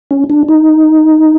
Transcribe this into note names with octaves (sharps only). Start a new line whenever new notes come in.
C#4
D4
D#4